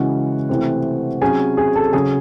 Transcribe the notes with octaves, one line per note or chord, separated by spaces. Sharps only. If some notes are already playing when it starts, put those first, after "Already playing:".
Already playing: C#3 E3 G#3 C#4 F#4 F#5
C3 E3 A3 C4
C3 F#3 C#4 G#4 G#5
G#4 G#5
A4 A5
C#3 F#3 C#4 G#4 G#5